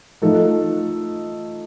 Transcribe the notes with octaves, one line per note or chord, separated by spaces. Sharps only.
F3 A3 D#4 A4